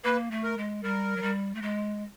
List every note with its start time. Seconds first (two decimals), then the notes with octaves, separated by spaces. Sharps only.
0.04 A#3 B4
0.31 A3
0.43 A#4
0.57 G#3
0.83 G3 A#4
1.17 F#3
1.22 G3
1.55 A3
1.62 G#3